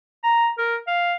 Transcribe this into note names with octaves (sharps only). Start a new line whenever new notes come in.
A#5
A#4
F5